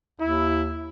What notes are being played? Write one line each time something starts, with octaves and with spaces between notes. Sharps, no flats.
D#2 E4